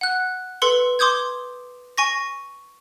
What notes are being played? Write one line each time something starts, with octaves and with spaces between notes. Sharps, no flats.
F#5 F#6
A4 B4 C6 E6 C#7 G7
C6 D6 D#6 G6 G#6
G#5 C#6 A#6